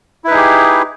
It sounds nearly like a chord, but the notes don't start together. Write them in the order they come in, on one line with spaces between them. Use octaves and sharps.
E4 B4 D#4 G#4 G4